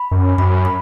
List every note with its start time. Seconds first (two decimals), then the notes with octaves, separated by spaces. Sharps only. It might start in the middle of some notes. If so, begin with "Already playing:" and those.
Already playing: B5
0.11 F#2
0.38 F#2 B5
0.65 B5